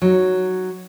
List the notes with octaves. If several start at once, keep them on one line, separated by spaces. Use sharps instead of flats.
F#3 D#4